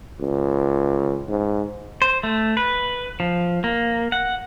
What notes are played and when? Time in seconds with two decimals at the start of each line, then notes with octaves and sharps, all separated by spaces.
0.20 C#2
1.29 G#2
2.02 C5
2.23 A3
2.57 B4
3.20 F3
3.64 A#3
4.12 F#5